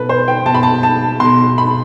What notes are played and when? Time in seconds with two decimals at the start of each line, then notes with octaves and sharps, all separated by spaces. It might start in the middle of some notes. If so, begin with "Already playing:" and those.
Already playing: B2 A4 B4
0.09 C5
0.28 G5
0.45 B2 A5
0.55 B5
0.63 A5
0.83 A5
1.20 B2 C6
1.58 B5